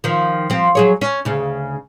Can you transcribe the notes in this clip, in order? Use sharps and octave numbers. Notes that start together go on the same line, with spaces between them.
D#3 F3
F3 C4
F#3 G#4 C#5
C#4
D2 C#3